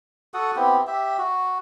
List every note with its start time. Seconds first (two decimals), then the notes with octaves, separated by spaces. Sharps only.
0.34 F#4 A4 F#5 D#6
0.56 B3 C4 E4 G4
0.87 G4 E5
1.18 F#4